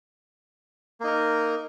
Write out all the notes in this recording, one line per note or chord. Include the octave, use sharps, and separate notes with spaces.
A#3 D#4 A#4